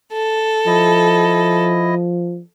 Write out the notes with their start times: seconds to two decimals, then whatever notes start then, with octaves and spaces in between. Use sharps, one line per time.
0.13 A4
0.66 F3 E4 D#5